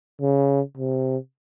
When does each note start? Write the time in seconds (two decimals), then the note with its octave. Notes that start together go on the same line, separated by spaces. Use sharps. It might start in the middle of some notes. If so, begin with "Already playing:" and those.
0.21 C#3
0.77 C3